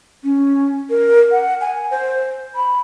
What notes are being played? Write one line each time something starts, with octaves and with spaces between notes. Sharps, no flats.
C#4
A#4
F#5
G#5
C5
B5